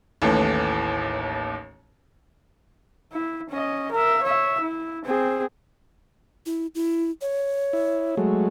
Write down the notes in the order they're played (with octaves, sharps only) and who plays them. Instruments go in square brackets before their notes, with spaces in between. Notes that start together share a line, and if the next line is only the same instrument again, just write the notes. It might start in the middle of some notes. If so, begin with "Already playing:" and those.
[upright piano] A1 D#2 A2 E3 A4
[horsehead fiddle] E4
C#4 D#5
A#4 E5
C#5 E5
E4
C4 G#4
[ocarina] E4
E4
C#5
[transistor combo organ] E4
F#3 G#3 A3